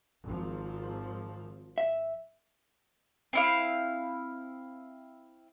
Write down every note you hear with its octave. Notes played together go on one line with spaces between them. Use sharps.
G#1 F3
E5
C4 E4 F5